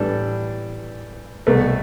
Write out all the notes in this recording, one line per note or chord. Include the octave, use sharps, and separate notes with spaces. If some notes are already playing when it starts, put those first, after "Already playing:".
Already playing: A2 E3 G3 D4 A4
C2 B2 A3